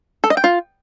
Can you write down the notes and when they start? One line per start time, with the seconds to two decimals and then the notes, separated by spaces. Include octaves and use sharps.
0.24 A4
0.30 D#5
0.37 G5
0.44 F4